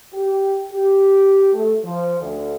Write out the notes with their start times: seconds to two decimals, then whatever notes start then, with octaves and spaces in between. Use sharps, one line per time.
0.14 G4
0.73 G4
1.53 A3
1.84 F3
2.21 D2